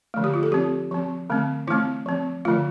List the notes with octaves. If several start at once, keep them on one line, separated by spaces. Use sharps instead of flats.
D3 F3 A3
G4
F4
A4
F3 C4 G4
F3 C4
D3 A3 C4
E3 A3 C4 E4
F3 C4
D3 F3 A3 F4